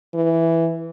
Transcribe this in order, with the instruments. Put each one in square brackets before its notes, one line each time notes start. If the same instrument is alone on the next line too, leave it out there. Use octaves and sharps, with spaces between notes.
[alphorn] E3